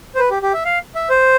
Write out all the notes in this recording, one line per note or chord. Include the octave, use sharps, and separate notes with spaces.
C5
B4
G4
G4
E5
F5
E5
C5